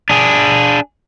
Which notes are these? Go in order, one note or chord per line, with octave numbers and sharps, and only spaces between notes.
D4 G#4